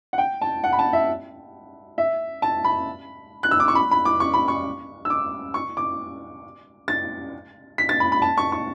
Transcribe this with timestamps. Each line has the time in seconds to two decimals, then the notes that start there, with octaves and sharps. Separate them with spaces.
0.13 F#5
0.18 G5
0.42 A5
0.64 F#5
0.73 B5
0.79 A5
0.93 E5
1.98 E5
2.42 A5
2.64 B5
3.43 F#6
3.51 E6
3.60 D6
3.68 C#6
3.75 B5
3.91 B5
4.05 D6
4.20 C#6
4.34 B5
4.48 C#6
5.05 E6
5.10 D6
5.54 C#6
5.77 D6
6.88 A6
7.78 B6
7.89 A6
8.00 B5
8.12 B5
8.22 A5
8.38 C#6
8.52 C#6